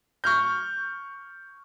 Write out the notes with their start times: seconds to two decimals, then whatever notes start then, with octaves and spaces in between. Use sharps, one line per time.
0.24 C#6 F6 G6